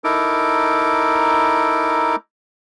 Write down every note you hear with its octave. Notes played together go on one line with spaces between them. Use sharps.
D#4 E4 A4 A#4 D6